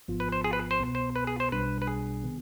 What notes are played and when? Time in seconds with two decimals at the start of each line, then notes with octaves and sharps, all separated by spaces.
0.08 G#1 G#2 F3 B3 F4
0.20 B4
0.32 C5
0.44 G#4
0.53 B4
0.71 C5
0.80 C2 B2 B3
0.95 C5
1.16 B4
1.27 G#4
1.40 C5
1.52 B1 B2 G3 D4 B4
1.82 B4
1.87 G#4
2.24 C3 D#3 B3